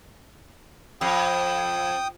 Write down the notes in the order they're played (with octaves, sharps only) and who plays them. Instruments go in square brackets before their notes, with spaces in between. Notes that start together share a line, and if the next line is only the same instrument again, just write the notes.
[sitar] F2 [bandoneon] G5 D#6